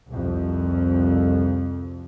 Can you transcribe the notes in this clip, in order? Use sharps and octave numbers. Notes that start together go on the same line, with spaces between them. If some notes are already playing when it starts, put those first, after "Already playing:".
C2 F2